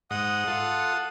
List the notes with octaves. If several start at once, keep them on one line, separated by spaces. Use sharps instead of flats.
G#2 D#5 F#5 D#6
F4 A4